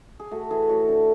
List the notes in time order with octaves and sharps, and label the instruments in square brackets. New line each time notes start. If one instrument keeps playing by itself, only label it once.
[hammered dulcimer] G#4
A3 F#4
E3 G#4
A2 F#4
D3